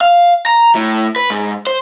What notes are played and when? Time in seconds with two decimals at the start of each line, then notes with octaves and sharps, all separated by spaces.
0.01 F5
0.46 A#5
0.75 A2
1.16 B4
1.30 G#2
1.67 C5